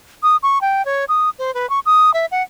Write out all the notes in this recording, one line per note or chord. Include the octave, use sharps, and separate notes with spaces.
D#6
C#6
G5
C#5
D#6
C5
B4
C#6
D#6
E5
F#5